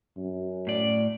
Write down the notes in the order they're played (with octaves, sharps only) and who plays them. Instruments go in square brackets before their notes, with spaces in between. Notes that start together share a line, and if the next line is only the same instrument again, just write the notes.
[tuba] F#2
[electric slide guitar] A2 D5